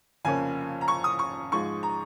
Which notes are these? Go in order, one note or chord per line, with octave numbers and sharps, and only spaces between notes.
F1 F2 C#3 A#3 C#4 G#5
A#5
C#6
D#6
C#6
G#2 F3 G#3 C#6
A#5